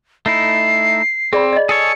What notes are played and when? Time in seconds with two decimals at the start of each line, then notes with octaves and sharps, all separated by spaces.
0.26 A3 D#4 E4 C7
1.33 C4 G#4 D5 B5
1.53 D5 D#5
1.69 G#4 A4 C#5 C#7